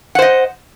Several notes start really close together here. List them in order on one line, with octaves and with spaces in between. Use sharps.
F#5 C5 D#5